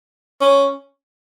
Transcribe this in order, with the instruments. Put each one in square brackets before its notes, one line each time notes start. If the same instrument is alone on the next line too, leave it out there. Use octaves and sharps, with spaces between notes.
[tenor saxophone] C#4